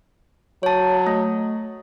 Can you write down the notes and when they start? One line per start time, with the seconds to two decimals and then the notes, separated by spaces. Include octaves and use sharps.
0.63 F#3 C#5 A5
1.07 A3